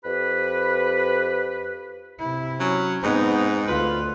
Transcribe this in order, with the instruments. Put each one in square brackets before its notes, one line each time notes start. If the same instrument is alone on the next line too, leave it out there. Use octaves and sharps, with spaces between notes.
[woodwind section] F2 G4 B4
[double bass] C3 E4
[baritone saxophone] F#3 [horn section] C#4
[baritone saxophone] G#2 [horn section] B3 [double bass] C4 D#4
[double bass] D2 [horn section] F4 B4